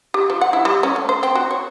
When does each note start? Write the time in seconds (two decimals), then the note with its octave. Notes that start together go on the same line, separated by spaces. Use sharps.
0.14 G4
0.30 F3
0.41 F#5
0.53 E4
0.65 G3
0.83 C#4
0.96 A3
1.09 C5
1.23 C4
1.35 F#4
1.51 C#5